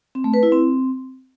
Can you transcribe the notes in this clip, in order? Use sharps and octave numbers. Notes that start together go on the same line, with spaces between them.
C4
A3
B4
E4
C4